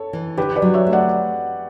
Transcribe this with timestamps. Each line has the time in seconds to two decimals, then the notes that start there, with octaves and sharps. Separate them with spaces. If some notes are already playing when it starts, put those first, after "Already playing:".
Already playing: A4 C#5
0.13 E3
0.37 D3 G4 B4
0.56 B4 D5
0.62 F#3
0.74 C#5 E5
0.87 A3
0.93 D5 F#5